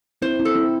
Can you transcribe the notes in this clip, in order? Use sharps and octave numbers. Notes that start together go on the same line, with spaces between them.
C4 E4 C5
C4 E4
A4
C4 E4